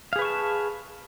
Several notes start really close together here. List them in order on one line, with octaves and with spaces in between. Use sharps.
F5 G#4 B4 C#6 A5